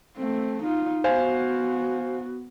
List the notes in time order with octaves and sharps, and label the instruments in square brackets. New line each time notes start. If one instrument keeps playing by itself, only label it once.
[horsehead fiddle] A3 C4
D#4 F4
[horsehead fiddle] B3 F#4 [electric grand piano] C5 F5 G#5